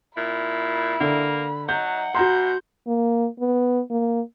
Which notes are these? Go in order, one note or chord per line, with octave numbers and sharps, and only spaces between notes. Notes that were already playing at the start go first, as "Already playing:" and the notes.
A#2 E4 B5
D3 A#3
F#3 D#4 F#5 G6
B2 F#4 A#5 C6 G6
A#3
B3
A#3